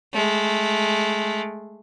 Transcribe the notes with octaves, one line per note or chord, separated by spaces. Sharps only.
G#3 A3